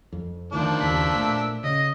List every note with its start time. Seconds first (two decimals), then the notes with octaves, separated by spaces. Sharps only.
0.12 F2
0.52 D2 D#3 F3 D4
0.81 F#1 D#2 E6 B6
1.15 A#2 A3
1.64 C#3 D#5